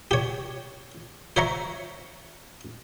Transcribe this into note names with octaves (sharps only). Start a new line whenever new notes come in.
G4 C#5
C5 C#5 E5 A#5 C#6